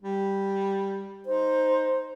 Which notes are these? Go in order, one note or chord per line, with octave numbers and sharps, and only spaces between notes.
G3
D#4 C5